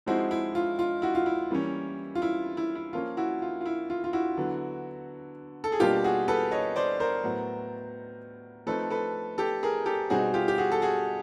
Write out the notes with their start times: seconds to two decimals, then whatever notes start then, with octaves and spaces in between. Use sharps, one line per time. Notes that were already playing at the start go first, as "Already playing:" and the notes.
0.06 F3 G#3 C4 D#4 E4 F#4
0.31 E4
0.55 F4
0.79 F4
1.02 E4 F#4
1.15 F4
1.26 E4
1.51 E3 G3 A#3 C#4
2.15 F4
2.22 E4
2.57 E4
2.75 E4
2.93 F3 A#3 C#4 F4
3.17 E4 F#4
3.42 F4
3.61 F4
3.66 E4
3.90 F4
4.04 F4
4.13 E4 F#4
4.37 D3 F#3 B3
5.64 A4
5.72 G#4
5.80 B2 G3 A#3 D4 F4 G4
6.04 F#4 G#4
6.28 A4 B4
6.51 C#5 D#5
6.76 C5 D5
7.00 A#4 C5
7.24 A2 F#3 B3
8.66 F3 A3 C4 D#4 A4 B4
8.90 A4 B4
9.38 G4 A4
9.63 G#4 A#4
9.86 G4 A4
10.10 B2 G3 C4 D#4 F#4 G#4
10.34 F4 G4
10.48 G4
10.58 F#4 G#4
10.72 A4
10.82 F#4 G#4